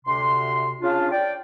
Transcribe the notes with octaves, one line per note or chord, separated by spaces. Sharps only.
D2 C3 C6
C#3 D4 F4
D5 G5